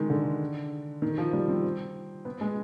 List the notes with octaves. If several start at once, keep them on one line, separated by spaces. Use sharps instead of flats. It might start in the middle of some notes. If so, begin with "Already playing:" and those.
Already playing: D#3 G#3
D3
D#3
F3
G3
C4
B3
G#3